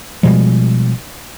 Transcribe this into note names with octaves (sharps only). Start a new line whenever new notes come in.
B2 F3 G3 G#3